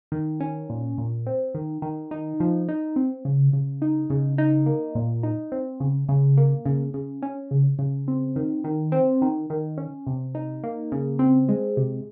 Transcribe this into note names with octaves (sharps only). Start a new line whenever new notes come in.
D#3
C#4
A#2
A#2
C4
D#3
D#3
D#4
F3
D#4
C4
C#3
C#3
D#4
C#3
D#4
A#3
A#2
D#4
C4
C#3
C#3
A#3
C#3
C#3
C#4
C#3
C#3
C4
D#3
D#3
C4
D#3
D#3
C#4
C3
D#4
A#3
C#3
C4
G#3
C3